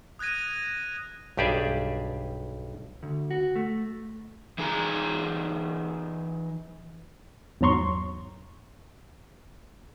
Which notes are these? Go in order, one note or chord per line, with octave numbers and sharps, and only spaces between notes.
D#6 F#6 G#6 A#6 D#7
B1 G2 G4 G#4 D5 E5
D2
F#4
A3
E3 D#4 G#4 A5 A#5
E2 G#2 F#3 A#5 C6 C#6